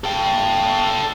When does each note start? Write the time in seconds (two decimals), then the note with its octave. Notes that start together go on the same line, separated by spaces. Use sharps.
0.04 A4 G5